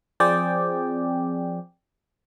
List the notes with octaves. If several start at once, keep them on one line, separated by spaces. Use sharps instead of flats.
F3 C4 G#4 D5 G5